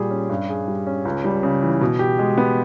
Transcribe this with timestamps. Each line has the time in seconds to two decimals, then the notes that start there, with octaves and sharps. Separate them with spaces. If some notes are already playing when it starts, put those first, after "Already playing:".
Already playing: A#2 G3 G#4
0.11 C#4
0.30 G2
0.49 G#4
0.68 G3
0.87 C#4
1.05 C#2
1.24 G3
1.43 C#3
1.61 E3
1.81 B2
1.99 G4
2.19 G#3
2.38 B3